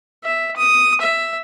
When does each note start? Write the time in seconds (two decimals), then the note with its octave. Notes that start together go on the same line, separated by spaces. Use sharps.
0.24 E5
0.56 D#6
1.01 E5